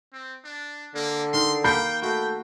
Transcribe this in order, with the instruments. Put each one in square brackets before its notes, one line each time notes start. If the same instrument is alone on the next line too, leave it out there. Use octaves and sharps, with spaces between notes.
[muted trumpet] C4
D4
[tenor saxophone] D3 [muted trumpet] A#3
[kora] D#3 [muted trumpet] C6
[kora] A#3 F5 [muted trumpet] G5 [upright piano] B5 G6 C7
[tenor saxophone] A3 [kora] F#4 [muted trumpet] G5